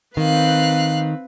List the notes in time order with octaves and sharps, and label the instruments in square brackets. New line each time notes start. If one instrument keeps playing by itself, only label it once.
[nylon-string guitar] D#3 [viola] C4 B4 [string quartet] F5 F#6